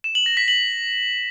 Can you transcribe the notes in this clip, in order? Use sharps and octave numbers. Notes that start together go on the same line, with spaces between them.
E7
F#7
A#6
B6
F#7